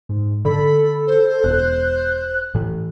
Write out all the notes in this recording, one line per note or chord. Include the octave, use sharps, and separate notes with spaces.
G#2
D3 A4 B5
C5
E1 F#6
A2 E3